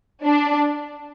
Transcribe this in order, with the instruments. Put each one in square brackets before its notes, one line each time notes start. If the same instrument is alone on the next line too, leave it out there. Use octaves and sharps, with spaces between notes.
[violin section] D4